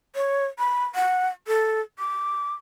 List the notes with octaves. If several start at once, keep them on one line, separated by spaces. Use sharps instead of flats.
C#5
B5
F#5
A4
D6